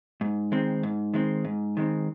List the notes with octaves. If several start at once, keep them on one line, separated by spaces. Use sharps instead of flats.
G#2
D#3 G#3 C4
G#2
D#3 G#3 C4
G#2
D#3 G#3 C4